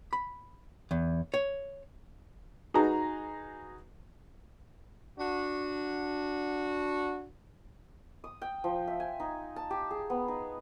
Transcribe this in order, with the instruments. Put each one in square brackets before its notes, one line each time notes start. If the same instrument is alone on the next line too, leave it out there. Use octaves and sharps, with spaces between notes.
[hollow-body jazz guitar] B5
E2
C#5
[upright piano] D#4 F#4 G#4 B4 A#5
[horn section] D4 F#4
[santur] D#6
G5
F3
E5
G#5
D#4
A5
G4
G#4
B3
D#4